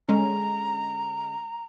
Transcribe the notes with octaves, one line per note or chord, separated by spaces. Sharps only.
D3 G#3 C#4 A#5